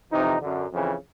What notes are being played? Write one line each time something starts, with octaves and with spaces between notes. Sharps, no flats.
F2 C3 E3 D#4
F#2 D3
F2 C#3 E3